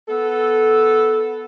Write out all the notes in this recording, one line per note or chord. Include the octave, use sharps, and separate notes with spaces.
B3 A4